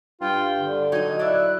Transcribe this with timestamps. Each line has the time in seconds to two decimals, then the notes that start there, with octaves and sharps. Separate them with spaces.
0.21 G2 F4 G5
0.59 D3
0.92 F#3 D#4 D#5 G#6
1.19 D4 E4 D5 F#6